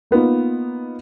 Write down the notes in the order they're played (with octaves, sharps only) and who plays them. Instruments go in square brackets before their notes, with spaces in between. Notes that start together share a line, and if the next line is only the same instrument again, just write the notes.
[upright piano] A#3 B3 D#4 F4